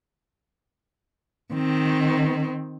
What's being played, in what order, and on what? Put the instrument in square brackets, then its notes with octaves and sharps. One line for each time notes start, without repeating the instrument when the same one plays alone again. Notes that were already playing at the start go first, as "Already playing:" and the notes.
[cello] D#3 C4